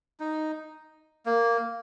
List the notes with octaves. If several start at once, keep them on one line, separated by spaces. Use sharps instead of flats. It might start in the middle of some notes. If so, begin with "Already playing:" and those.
D#4
A#3